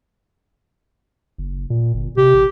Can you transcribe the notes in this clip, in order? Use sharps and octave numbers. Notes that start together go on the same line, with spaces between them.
F#1
A#2
G1
C3 G4
A1